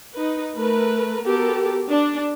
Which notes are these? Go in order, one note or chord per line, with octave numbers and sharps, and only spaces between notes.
D#4 B4
A3 A#4 B4
B3 F#4 G4 A4 A#4
D4